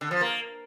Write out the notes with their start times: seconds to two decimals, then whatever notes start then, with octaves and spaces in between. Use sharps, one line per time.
0.01 D3
0.11 F3
0.21 A#3